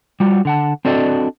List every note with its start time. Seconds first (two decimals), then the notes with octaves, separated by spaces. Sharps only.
0.20 G3 F4 F#4
0.45 D3 F#5 A5
0.85 C4 D4 F#4 A4 D5 D#5